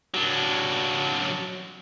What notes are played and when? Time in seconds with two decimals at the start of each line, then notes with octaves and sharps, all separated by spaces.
0.14 F#3 D4